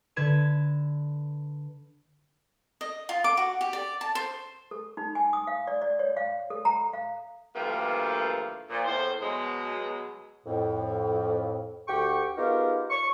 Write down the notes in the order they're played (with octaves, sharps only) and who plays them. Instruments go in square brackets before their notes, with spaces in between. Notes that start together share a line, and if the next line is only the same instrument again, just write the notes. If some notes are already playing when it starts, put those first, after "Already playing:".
[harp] D3 B4 G#6 E7
[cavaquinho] D#5
F4
D6
F#4
G4
D5
A5
C5
[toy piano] A4
D#4
G#5
D#6
F5
D5
D5
C#5
F5
A4
A#5
F5
[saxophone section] D2 G2 E3 F3 A3 A#3
A#2 F3
E2 A2 C5
B2 F#3 G#3
[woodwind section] F2 A2
D2 G4 F#5 G5 C#6
B3 D#4 F4 G4 G#4 A#4
C#6